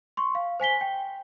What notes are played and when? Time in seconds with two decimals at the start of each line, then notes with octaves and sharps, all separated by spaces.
0.17 C6 C#6
0.35 F5
0.60 C5 G#5 B6 G7
0.81 G5